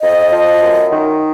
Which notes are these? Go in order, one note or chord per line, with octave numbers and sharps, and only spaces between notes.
F2 D#5
F3
F#2
D#3